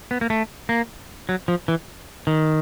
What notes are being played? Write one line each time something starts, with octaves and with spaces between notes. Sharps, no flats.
B3
A#3
A3
A#3
F#3
F3
E3
D#3